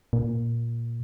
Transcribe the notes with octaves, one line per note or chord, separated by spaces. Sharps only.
A#2